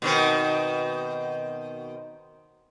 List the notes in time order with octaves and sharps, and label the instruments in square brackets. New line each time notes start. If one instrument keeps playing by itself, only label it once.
[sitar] B2 D#3 C4